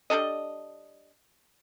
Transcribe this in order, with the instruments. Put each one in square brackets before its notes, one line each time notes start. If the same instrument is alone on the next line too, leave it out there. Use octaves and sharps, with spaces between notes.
[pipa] G3 D4 A4 D#5